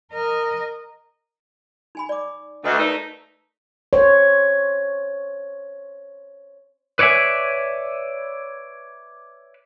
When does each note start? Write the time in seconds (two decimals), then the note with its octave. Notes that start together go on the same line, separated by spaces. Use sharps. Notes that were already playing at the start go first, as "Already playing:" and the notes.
0.12 A#4 D#5
1.95 D#4 G#5 B5
2.09 D5 D6
2.64 D2 A4 B4 D#5
2.78 A3 D#4 A#4 B4 D5
3.93 C5 C#5
6.99 B4 C#5 D5 E5 G#5